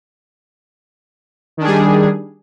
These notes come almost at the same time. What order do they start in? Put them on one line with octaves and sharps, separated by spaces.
D#3 D4 G#4 G3